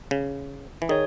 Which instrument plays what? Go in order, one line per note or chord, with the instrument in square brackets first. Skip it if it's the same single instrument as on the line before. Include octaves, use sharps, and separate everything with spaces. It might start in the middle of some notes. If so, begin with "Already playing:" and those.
[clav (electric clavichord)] C#3
E3
[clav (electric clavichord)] D#3 [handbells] G#4 C#5